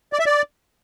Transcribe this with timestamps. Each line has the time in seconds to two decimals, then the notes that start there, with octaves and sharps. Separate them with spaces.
0.13 D5
0.20 E5
0.26 D5